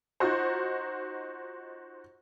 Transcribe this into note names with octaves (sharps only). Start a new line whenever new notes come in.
D#4 F4 F#4 C5